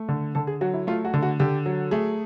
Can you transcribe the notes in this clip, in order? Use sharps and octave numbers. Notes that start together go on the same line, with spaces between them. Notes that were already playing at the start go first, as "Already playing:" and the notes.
Already playing: A3
D3
D3 A4
G#4
F#3 F#4
E4
A3 F4
F#4
D3
F#4
D3 G4
F#3
A3 G#4